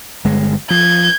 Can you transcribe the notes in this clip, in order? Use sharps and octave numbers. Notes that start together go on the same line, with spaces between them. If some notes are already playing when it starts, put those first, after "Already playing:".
G1 G#3
F3 G6 G#6